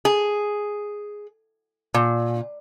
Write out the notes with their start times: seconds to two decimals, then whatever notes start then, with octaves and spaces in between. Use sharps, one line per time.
0.05 G#4
1.94 A#2